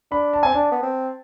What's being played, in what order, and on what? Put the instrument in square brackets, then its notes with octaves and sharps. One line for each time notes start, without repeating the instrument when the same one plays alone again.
[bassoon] D4 [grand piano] B5
[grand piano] A5
[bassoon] C4 [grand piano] G#5
[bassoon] D4 [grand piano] A5
[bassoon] B3
C4